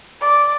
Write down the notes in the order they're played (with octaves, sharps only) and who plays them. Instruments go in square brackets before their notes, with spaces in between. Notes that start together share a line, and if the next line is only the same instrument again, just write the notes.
[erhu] D5